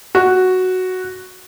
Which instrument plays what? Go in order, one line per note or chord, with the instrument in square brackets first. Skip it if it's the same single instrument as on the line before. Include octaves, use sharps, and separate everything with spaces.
[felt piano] F#4